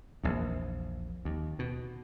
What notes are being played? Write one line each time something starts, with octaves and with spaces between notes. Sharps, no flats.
A#1 E2
D#2
B2